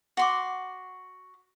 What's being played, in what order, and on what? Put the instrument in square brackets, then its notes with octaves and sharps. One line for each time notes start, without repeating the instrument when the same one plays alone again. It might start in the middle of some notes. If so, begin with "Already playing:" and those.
[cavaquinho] F#4 C6 D6